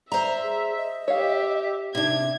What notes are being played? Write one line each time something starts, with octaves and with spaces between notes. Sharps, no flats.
C5 D5 E5 A#5
G#4
D#5
G4 C#5 E5 F5
C3 D4 D#4 G#6